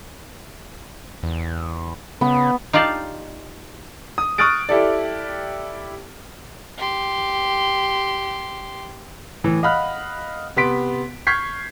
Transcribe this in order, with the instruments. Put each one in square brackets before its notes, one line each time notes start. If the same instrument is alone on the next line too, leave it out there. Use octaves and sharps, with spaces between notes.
[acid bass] E2
[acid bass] C#3 [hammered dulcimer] B3
[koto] D#4 F4 G4 D5 F5 A5
[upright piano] D#6
C#6 D#6 F6 F#6 A6 D7
E4 G4 A4 D5
[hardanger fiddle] G4 C6
[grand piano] A2 E3
D#5 F5 F#5 B5 F6 F#6
C3 B3 C6 B6 D7
C#6 F6 G6 G#6 B6 C7